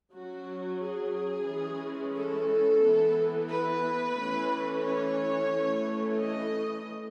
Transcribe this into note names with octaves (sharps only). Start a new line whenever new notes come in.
F#3 C#4 F#4
G#4
E3 G#3 C#4
A4
E3 B3
B4
E3 A3 C#4
C#5
E3 A3 C#4
D#5